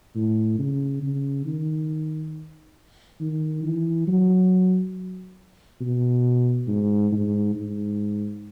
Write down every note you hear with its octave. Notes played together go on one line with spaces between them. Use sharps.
A2
C#3
C#3
D#3
D#3
E3
F#3
B2
G#2
G#2
G#2